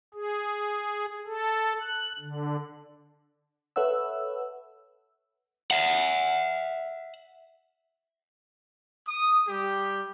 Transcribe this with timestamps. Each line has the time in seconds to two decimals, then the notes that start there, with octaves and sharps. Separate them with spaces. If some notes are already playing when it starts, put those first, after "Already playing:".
0.14 G#4
1.27 A4
1.80 F#6
2.19 D3
3.76 A4 B4 C#5 E5 F#5 E6
5.71 E5 F#5
9.07 D#6
9.47 G3 G4